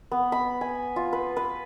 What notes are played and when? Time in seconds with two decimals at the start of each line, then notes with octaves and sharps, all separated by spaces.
0.11 B3
0.32 B5
0.61 G#5
0.96 F4
1.13 B4
1.37 B4